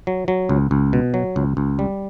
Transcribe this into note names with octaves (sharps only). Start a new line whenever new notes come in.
F#3
F#3
C#2
C#2
B2
F#3
C#2
C#2
G3